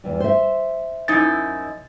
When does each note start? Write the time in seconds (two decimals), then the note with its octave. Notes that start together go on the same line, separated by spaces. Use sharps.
0.04 E2 G3
0.20 C5 E5
1.08 F#2 D#4 E4 A6